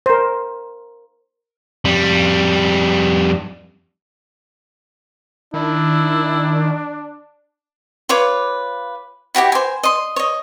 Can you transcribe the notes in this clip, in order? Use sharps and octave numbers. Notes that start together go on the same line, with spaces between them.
A#4 C5
F2 G3
D#3 D4 E4
F4 B4 C#5 D6
E4 F#4 G4 G5
C5 G#5
D#5 C6
C#5 D#5